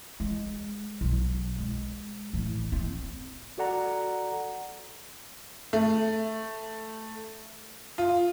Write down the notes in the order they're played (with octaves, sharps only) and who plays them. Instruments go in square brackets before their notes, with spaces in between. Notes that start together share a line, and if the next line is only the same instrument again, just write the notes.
[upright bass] G#3
B1
G#3
A1
C4
[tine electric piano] F#4 A4 D5 F#5 A#5
[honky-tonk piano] A3
F4